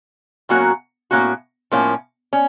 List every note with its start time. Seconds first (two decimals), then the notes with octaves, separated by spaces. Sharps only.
0.49 A2 F#3 A#3 C#4 F#4
1.11 A2 F#3 A#3 C#4 F#4
1.72 A2 F3 A#3 C#4
2.33 C#4